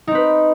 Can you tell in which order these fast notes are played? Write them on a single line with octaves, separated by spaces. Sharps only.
D#4 C4 B4